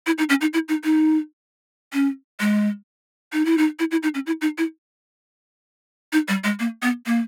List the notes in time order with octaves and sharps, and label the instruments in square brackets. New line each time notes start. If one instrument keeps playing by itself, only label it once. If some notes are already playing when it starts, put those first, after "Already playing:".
[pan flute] E4
D#4
C#4
D#4
E4
D#4
D#4
C#4
G#3
D#4
E4
D#4
E4
E4
D#4
C#4
E4
D#4
E4
D#4
G3
G#3
A#3
B3
A#3